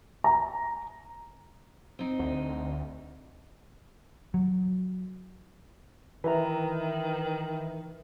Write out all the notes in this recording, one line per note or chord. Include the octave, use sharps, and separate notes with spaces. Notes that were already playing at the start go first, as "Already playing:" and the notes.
A#5
C4 D#4
D2
F#3
D#3 E3 B4 E5 A#5